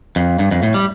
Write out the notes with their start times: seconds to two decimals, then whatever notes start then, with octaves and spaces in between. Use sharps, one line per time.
0.16 F2
0.39 G2
0.51 F2
0.63 A2
0.74 G3